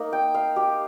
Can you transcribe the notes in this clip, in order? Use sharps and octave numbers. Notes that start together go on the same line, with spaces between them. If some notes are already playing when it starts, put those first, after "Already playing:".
Already playing: A#3 D#4
G5
F5
G4